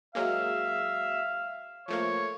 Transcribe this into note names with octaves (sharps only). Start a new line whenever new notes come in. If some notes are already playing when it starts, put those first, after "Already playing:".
F#3 G#3 A#3 E5 F5
F3 A3 A#3 C#5